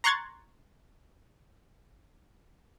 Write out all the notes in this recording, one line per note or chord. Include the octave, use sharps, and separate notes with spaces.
A#5 C6 C#6 F#6 G#6 A6